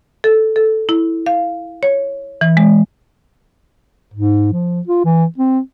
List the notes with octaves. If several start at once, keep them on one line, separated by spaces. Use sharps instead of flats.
A4
A4
E4
F5
C#5
E3
G#3
G#2
F3
F4
E3
C4